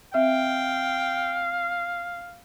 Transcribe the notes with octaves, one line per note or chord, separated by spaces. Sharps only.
C4 E5 F5 G5